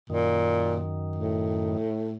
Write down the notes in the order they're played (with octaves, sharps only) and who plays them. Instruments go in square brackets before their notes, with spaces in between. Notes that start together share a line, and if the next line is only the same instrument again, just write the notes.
[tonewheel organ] F#2 D#3 [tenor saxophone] A#2
[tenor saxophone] A2